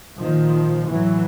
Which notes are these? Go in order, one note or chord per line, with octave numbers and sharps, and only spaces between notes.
A#2 D#3 F3
A2 E3 F#3